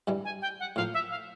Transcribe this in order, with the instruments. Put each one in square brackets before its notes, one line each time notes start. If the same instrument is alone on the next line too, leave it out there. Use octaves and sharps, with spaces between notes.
[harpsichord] G2 E3 G3
[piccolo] G#5
G5
F#5
[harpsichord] A2 F3 A#3 [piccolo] F5
[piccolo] E5
F5